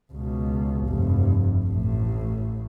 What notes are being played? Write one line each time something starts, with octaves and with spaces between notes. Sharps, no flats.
C#2 B2
F1 G2
A1 A2